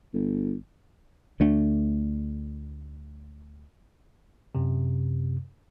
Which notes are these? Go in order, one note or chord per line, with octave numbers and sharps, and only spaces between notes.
G1
D2 A3 D4
F#2 C3